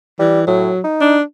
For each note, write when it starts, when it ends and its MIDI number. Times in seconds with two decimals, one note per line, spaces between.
0.19 0.44 52
0.19 0.41 55
0.47 0.71 45
0.47 0.81 54
0.84 1.16 63
1.01 1.22 62